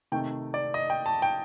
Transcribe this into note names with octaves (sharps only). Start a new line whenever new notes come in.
C3 D#3 A3 G5
D5
D#5
G5
A5
G5